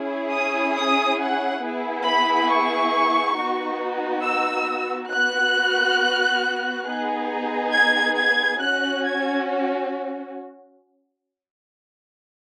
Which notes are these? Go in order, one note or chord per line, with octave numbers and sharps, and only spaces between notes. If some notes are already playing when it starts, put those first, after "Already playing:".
Already playing: C#4 E4 G#4
D#6
D#6
F#5
B3 E4 G#4
B5
C#6
B3 D#4 F#4
E6
B3 F#4 F#6
B3 D#4 G#4
G#6
G#6
C#4 F#4 F#6
G#6